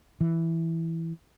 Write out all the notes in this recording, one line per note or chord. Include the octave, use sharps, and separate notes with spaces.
E3